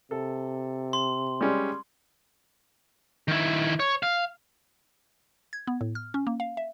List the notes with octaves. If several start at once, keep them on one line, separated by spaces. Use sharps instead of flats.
C3 A4
C6
G3 G#3 C#4
D#3 E4
C#5
F5
G#6
B3
A2
F6
C#4
A#3
F5
E5